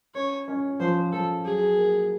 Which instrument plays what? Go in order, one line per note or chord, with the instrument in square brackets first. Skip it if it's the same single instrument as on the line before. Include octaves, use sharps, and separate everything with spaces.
[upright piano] C#4 [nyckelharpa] C#5
[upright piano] C#4
[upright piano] F3 [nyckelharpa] C5
[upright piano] F3 [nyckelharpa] A4
[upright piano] F#3 [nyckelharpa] G#4
[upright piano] A#3